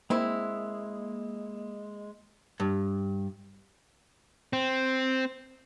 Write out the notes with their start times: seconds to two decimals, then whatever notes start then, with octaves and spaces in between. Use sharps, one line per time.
0.10 G#3 A#3 C4 E4
2.60 G2
4.53 C4